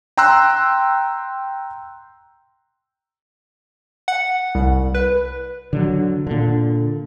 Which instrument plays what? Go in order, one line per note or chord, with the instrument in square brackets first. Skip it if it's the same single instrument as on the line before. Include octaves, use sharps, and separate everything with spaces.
[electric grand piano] G5 A#5 C6 E6 F#6
[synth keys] F#5
C2
B4
[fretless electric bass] D3 F3 F#3
A#2 D3